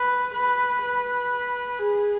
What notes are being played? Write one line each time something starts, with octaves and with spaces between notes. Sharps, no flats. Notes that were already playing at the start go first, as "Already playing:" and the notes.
Already playing: B4
B4
B4
G#4